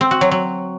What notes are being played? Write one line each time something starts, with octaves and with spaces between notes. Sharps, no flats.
C4
F#4
F#3
F#3